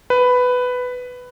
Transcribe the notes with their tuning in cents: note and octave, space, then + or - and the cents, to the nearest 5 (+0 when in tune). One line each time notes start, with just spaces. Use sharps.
B4 +10